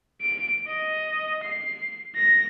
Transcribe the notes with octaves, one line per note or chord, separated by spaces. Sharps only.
D7
D#5
C7
A#6